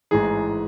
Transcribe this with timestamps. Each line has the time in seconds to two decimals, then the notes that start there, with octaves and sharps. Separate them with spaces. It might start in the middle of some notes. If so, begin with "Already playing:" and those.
0.11 A1 G#2 E3 G#4